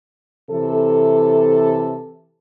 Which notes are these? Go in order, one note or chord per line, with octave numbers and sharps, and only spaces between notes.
C3 E3 A4